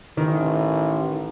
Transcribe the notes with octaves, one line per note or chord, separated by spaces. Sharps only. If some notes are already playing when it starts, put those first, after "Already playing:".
A1 D#3